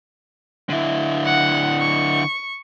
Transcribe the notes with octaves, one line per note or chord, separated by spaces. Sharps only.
D3 E4
F#5
C#6